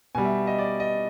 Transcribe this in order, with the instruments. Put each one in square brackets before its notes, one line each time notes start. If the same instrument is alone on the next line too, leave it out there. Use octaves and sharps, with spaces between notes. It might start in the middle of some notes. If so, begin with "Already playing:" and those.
[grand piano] B2 G3 G#5
E5
D#5
D5
D#5